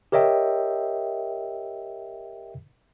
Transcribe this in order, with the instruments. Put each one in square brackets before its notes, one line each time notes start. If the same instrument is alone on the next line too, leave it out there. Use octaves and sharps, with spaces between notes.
[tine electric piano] G4 A#4 C#5 D#5 E5 G5